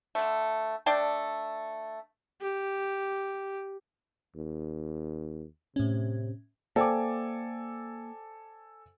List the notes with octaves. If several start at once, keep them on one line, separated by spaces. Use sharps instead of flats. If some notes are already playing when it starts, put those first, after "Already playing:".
D3 A3
A3 D4 D5 G5
G4
D#2
A2 C3 C#4
A#3 A4 C5 D5 G5 G#5 D6